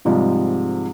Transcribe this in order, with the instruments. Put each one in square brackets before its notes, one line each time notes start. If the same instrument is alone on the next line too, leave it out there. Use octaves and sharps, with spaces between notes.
[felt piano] G#2 C3 F3 G3 G#3